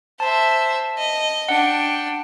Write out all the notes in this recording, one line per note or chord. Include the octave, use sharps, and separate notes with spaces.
C5 E5 A5
D#5
D4 F#5 G5